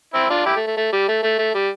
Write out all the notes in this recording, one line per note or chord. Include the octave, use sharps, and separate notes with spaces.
C4 E4
D4 F4
E4 G4
A3
A3
A3
G3
A3
A3
A3
G3